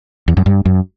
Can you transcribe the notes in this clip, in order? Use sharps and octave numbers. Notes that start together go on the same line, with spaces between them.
E2
F#2
G2
F#2